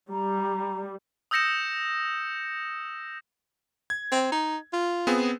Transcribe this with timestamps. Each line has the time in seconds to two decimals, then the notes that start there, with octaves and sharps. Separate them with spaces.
0.11 G3 A#5
1.31 D#6 E6 G6 A#6 C#7 E7
3.90 G#6
4.12 C4
4.32 D#4
4.73 F4
5.07 B3 C4 G#4